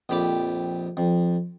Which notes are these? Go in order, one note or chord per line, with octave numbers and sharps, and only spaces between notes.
A#1 F2 G4 B5 D6
F2